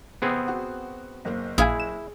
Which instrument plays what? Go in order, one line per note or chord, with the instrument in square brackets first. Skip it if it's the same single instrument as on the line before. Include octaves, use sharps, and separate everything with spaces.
[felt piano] E2 C3 [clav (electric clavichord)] B3 C4 G#4
[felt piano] F#4
F#1 A#3 C5
[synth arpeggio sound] A#1 F5 G#5 [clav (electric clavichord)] E4 [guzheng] G#4
[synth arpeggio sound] E7